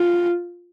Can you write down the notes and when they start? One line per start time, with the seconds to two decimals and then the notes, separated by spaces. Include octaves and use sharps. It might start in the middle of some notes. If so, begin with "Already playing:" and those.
Already playing: F4